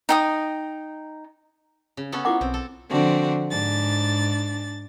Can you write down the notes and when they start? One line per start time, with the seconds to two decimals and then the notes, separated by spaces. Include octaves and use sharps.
0.09 D#4 G5 D#6
1.97 C#3
2.12 B3 C#4 A4
2.25 E4 F4 F#5 A#5 D6
2.41 B1 C4
2.54 A4
2.90 D3 F3 C4 D4 F#4
3.50 G#2 D4 A6